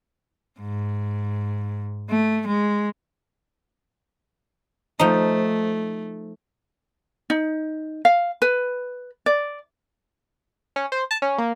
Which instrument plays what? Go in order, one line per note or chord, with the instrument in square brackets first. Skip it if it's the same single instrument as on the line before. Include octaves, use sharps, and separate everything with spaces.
[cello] G#2
A3
G#3
[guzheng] F3 D#4 [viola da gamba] A3
[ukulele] D#4
F5
B4
D5
[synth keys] C#4
C5
A5
C#4
A#3